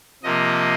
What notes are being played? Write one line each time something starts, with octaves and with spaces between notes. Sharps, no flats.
C3 F3 A#3 D#5